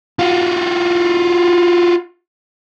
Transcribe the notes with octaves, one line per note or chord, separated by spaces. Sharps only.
F4 F#4